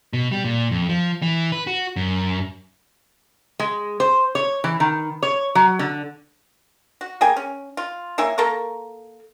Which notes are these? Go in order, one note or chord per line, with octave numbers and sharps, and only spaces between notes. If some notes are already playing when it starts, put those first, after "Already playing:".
B2
G3
A#2
F2
F3
E3
B4
F#4
F#2
G#3
C5
C#5
E3
D#3
C#5
F#3
D3
F#4
A#3 G#4 G5 G#5
C#4
F4
A#3 E4 C#5 G#5
A#3 A4 A#4 C#6